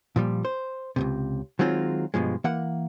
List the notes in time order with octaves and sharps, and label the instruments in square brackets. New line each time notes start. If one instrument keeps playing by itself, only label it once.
[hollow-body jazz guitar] A#2 F3 G3
C5
C#2 F#2 C3
D#3 F#3 G#3 C4 F4
G2 B2 F3 G#3
E3 A#3 F#5